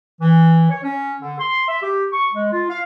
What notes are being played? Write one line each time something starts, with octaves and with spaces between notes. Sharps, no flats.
E3
C#5
C#4
D3
C6
E5
G4
C#6
G#3
F4
F5